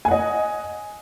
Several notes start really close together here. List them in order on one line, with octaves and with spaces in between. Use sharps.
G#5 F#5 D#5